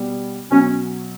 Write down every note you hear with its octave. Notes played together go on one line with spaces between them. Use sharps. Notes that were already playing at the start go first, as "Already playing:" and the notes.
Already playing: B2 G3 B3
B2 F#3 C#4